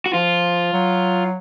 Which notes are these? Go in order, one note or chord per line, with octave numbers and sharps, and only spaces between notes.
F#4
F3 F4
F#3